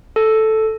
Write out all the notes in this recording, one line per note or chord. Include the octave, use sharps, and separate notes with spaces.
A4